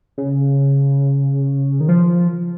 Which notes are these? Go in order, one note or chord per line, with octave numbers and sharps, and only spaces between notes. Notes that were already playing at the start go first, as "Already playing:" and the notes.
C#3
D#3
F3